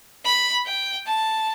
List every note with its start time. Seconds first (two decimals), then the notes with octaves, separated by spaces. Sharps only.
0.25 B5
0.66 G5
1.06 A5